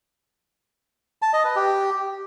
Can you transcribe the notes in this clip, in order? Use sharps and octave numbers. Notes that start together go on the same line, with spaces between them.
A5
D#5
B4
G4